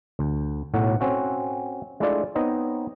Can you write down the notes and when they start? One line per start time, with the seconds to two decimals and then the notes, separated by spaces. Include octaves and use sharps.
0.19 D2
0.74 B1 A2 F#3 F#4
1.00 C4 C#4 F#4 A4
2.00 G#3 A3 D4 E4 F4 D5
2.35 B3 C4 D#4 C#5 D#5